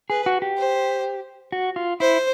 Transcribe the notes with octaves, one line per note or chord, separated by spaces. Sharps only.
G#4 B4
F#4
G4
C5
F#4
F4
E4 C5